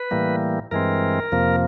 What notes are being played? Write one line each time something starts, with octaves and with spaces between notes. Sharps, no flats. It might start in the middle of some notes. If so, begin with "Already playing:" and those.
Already playing: B4
A2 E3 G3 A#3
G2 E3 G#3 C4 A#4
F2 C3 F3 A#3